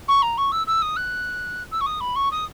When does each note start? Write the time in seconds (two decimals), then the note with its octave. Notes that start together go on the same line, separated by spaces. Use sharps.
0.08 C#6
0.22 A#5
0.38 C#6
0.52 E6
0.67 E6
0.82 D#6
0.96 F#6
1.71 E6
1.81 C#6
1.86 D#6
2.00 B5
2.16 C#6
2.31 D#6